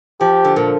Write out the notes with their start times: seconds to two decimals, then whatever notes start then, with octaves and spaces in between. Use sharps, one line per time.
0.20 F3 G4
0.45 D3
0.56 A#2